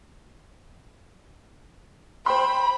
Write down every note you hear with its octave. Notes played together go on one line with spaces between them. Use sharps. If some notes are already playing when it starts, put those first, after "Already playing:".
C5 G5 B5 C6